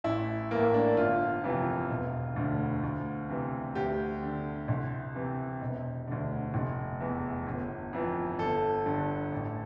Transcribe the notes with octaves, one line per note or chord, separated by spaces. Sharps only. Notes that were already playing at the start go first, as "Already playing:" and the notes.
A1 E4
A2 E3 A#3
D4
G1 F4
F2 C3 E3
E1
D2 D3
D2
C3 E3
D2 G4
D3
C2
C3 E3
E1
D2 D3
F1
E2 E3
G1
F2 E3
G1 A4
G2 D3
A1